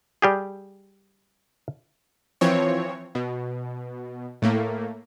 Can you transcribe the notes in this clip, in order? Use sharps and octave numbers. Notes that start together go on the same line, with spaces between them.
G3 G4 G#4
E3 F3 C4 C#5
B2
A2 A3 A#3